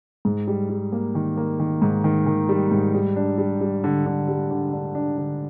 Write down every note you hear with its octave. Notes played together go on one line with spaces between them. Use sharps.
G#2
G3
G3
A#3
D#3
A#3
D#3
G#2
D#3
D#3
G3
G#2
G3
D4
G3
G3
D3
D3
G3
D3
D4
D4
D3